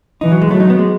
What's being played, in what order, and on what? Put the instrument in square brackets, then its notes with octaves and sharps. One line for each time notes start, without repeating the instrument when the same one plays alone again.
[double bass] E3 [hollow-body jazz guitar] D#4
[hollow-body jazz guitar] F#3
G#3
[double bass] F#3 [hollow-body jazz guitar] A3
[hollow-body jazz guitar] D#4
B3
G#3